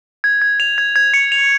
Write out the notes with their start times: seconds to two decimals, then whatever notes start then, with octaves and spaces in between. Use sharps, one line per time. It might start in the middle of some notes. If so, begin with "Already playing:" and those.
0.24 G#6
0.42 G#6
0.60 F7
0.78 G#6
0.96 G#6
1.14 C#7
1.32 F7